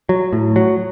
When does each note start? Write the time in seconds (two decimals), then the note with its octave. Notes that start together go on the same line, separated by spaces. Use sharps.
0.09 F#3
0.33 A2
0.56 F#3